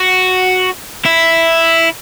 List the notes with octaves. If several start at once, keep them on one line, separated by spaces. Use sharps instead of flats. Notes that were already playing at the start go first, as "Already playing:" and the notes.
Already playing: F#4
E4